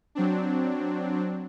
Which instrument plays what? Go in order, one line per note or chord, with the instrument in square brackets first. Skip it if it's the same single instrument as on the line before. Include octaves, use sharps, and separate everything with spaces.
[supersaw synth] F#3 C4 D4